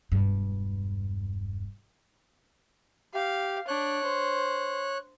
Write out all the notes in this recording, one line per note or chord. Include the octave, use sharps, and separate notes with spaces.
E1 G2
G4 F5
D4 C#5 F#6
C5